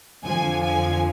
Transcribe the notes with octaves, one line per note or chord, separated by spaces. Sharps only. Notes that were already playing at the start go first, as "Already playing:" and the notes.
F2 D3 F3 G#5
G#5